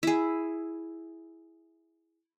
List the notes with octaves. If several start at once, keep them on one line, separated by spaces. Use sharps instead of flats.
E4 G#4